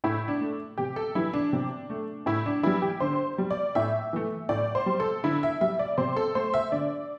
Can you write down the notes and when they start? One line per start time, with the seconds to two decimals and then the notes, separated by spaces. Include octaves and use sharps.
0.04 A2 E4
0.28 D4
0.41 A3
0.78 C3 G4
0.96 A4
1.15 E3 G3 E4
1.34 D4
1.53 C3
1.90 A3
2.26 A2 E4
2.46 D4
2.63 E3 G3 E4
2.82 G4
3.00 D3 C5
3.38 G3
3.51 D5
3.75 A2 E5
4.13 E3 A3
4.49 A2 D5
4.75 C5
4.86 G3
5.00 A4
5.24 D3 E4
5.43 E5
5.61 G3 E5
5.79 D5
5.98 C3 C5
6.16 A4
6.35 A3 C5
6.54 E5
6.72 D3 D5